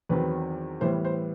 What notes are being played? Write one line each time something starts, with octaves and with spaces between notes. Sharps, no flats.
E2 D#3 F#3 C4 B4
A2 E3 G3 B3 C5
C5